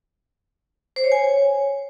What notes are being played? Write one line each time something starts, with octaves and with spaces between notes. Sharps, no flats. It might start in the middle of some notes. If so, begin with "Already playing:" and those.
C5
C#5
G#5
C#5